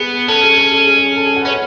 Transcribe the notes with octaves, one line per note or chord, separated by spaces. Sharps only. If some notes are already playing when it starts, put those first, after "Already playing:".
Already playing: B3 G#4
C#4 A4
G#4
A4
G#4
G#4
A4
G#4
F#4
B4
C#4 C#5